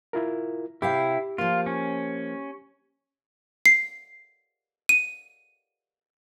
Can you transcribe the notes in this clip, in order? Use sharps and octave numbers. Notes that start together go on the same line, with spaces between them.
E4 F4 A#4
C3 E4 G4 F5 G5
F3 A#3 F4
C#4
C7
D#7